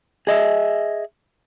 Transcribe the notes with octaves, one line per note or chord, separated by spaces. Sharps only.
G#4 D#5 E5